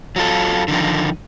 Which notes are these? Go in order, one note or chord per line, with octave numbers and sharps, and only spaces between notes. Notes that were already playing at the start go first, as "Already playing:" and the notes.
F#3 F4 A4
D3 D#3 F3 D#4